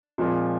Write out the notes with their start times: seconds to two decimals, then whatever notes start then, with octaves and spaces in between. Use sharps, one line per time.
0.18 A#2 F3 G#3 C4